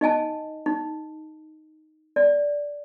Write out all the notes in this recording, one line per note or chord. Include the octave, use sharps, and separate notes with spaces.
D#4 D#5 G#5 A5
D#4
D5